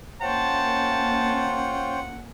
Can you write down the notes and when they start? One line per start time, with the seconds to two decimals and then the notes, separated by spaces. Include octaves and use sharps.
0.22 A#3 C#4 F4 C5 C#5 F#5 G5 A5